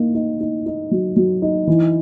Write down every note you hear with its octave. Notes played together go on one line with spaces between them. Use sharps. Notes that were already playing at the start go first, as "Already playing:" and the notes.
Already playing: A#3 D#4
D#4
D#4
D#4
F#3
F#3
D#4
E3